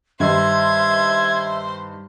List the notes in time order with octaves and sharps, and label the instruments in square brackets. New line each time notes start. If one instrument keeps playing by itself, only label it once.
[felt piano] G2 D#3 [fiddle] C5 C6 [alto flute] E5 [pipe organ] G#6